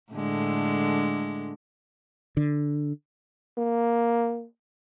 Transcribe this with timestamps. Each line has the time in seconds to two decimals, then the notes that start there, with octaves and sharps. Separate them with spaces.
0.12 A2 D3 G#3
2.37 D3
3.58 A#3